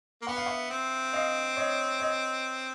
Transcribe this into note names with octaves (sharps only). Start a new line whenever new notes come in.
A#3
B3 F#5
F5
E5 F#5
C4
D#5 F5
C#5 D#5
C#5 D#5